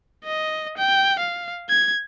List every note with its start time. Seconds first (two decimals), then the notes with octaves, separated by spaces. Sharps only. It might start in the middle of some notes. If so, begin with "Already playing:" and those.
0.25 D#5
0.78 G5
1.19 F5
1.69 G#6